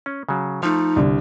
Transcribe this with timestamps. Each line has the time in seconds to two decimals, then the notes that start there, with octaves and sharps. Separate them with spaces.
0.06 C#4
0.29 C#3 F#3
0.63 F3 A3 D#4
0.96 C2 D3